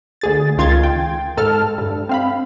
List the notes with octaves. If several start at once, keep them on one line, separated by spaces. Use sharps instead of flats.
D2 G#4 A6
C#2 D#3 F4 C6 G#6 A6
G5
G#2 A4 A5 F6
G2
C4 F5 B5